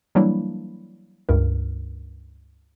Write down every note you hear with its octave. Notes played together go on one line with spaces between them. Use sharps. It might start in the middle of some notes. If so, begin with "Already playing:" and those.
E3 F#3 G3 A#3 D4 E4
C#2 G2 A#4